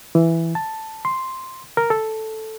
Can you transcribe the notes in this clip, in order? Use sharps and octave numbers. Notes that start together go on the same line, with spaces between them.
E3
A5
C6
A#4
A4